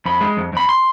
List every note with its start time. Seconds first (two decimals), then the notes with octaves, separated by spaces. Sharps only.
0.06 F2 B5
0.21 G#3
0.37 F2
0.53 F2 B5
0.69 C6